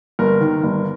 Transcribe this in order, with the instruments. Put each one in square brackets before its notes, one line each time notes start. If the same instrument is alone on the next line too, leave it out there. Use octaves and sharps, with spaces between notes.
[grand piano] G1 A#4
D#3
G1